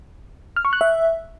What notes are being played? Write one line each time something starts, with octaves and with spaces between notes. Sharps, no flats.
F6
C#6
F#6
E5